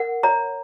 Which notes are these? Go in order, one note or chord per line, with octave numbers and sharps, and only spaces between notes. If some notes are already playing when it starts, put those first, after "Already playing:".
Already playing: A#4 F#5
C#5 A#5